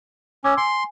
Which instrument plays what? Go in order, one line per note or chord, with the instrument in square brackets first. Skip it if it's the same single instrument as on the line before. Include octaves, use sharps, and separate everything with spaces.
[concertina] C#4 [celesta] D6 E6 G#6
[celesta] G#5 [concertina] C6